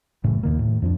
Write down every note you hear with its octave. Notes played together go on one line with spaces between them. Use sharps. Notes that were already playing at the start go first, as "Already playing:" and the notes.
F#1 A2 C#3 E3
D#2 D#3 A#3
A2
F2 F3 D4